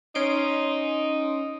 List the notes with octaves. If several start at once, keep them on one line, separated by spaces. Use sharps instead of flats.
C#4 D#4 C6 D7